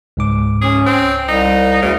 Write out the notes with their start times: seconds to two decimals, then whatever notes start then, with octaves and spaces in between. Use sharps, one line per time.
0.17 C#2 G#2 D6
0.62 C#4 G#4
0.86 C4 C5
1.29 C2 D#4
1.82 D2 C#3